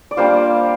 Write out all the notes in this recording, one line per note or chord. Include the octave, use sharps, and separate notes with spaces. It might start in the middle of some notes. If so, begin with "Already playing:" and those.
D5
G3 A#3 D4 F4 C5